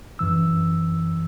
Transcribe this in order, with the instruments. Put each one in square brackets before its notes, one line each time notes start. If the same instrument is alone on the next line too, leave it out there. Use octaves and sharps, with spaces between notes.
[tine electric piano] F#2 E3 E6